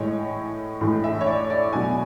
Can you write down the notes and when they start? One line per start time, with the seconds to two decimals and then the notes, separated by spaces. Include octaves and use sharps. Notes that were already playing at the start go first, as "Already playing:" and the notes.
Already playing: A2 E3 G#3 C#5
0.81 A2 E3 G#3
1.04 E5
1.21 C#5
1.27 D5
1.50 D5
1.73 B2 F#3 G#5